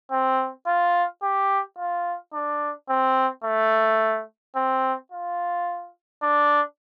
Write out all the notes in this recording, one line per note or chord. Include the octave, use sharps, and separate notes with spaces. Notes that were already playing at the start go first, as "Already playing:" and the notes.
C4
F4
G4
F4
D4
C4
A3
C4
F4
D4